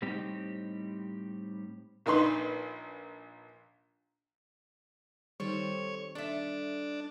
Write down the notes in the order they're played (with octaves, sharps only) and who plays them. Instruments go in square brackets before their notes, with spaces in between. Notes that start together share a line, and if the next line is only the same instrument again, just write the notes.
[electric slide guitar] A2 G3 C4 D#4 G4
[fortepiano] A#1 D#4 B4 C6
[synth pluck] D#3 G3 [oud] C4 A4 [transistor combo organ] C#5
[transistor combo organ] D4 [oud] A4 E5